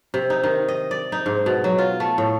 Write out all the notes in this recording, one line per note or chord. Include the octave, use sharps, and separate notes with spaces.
C3
D#4
D#3
D#5
D5
D#4
G#2
B2
F#3
F4
A3
A2